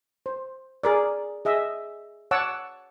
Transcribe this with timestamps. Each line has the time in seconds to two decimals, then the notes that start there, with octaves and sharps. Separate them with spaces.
0.26 C5
0.84 G#4 A#4 D5
1.45 G#4 D#5 E5
2.31 C#5 F#5 A5 D6 E6